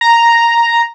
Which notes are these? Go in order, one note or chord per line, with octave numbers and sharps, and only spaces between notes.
A#5